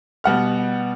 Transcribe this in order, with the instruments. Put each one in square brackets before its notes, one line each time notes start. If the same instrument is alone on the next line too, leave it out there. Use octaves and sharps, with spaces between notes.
[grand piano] B2 G3 F#5 F6